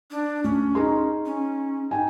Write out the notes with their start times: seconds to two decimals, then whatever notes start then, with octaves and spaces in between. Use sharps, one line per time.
0.11 D4
0.44 D2 C#4
0.75 D#4 G#4 C6
1.26 C#4
1.91 D#4 G5 G#5